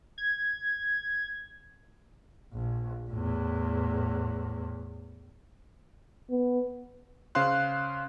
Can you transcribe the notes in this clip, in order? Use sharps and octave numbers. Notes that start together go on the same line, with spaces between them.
G#6
A#1
E2 A2
B3
C#3 C5 F5 C6 F#6